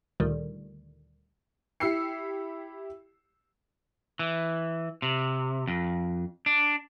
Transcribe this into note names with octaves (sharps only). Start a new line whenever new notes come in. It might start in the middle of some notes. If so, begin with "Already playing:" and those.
D2 A#2 D3 D#3 G3
E4 G4 E6 C7 C#7
E3
C3
F2
D4